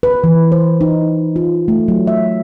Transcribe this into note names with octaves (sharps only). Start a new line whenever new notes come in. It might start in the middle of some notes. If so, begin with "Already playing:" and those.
B4
E3
C5
D#4
F4
A3
F#3
E5